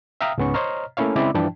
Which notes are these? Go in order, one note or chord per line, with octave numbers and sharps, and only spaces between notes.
E5 F5 G5 A#5 D#6 F6
C#2 G#2 B3 C#4 C#6
C5 C#5 D#5 A#5 F6
A3 A#3 C#4 E4 C#5 F5
C#3 G#3 C4 E4 D5 D6
G2 E3 F3 D4 G5 A5